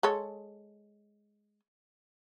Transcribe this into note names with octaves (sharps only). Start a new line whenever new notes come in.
G#3 A4 C#5